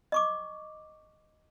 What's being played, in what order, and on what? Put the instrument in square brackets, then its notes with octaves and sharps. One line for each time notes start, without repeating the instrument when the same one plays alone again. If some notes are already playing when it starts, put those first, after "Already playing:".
[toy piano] D#5 C#6 D6